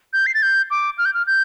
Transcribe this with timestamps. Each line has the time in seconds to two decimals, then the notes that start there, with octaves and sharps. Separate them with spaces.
0.13 G6
0.26 C7
0.34 A6
0.42 G6
0.71 D6
0.98 F6
1.05 G6
1.14 F6
1.27 G6